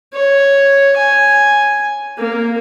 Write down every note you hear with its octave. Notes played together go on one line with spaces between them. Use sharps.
C#5
G#5
A#3